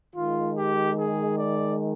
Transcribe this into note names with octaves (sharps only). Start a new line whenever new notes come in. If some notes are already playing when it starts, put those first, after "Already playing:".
D#3 G#3 F4
G4
G#4
D5